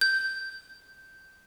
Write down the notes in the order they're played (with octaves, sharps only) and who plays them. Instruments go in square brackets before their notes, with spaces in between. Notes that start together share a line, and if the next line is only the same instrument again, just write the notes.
[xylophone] G6